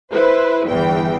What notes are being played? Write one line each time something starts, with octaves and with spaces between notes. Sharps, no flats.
E4 B4 C5
G1 E2 E3 G5